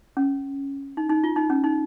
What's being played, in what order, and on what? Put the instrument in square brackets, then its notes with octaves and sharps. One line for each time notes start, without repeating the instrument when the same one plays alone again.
[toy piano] C#4
D#4
D#4
F4
D#4
C#4
D#4